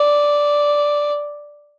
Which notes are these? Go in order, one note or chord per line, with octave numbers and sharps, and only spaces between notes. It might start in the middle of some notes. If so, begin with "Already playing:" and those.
Already playing: D5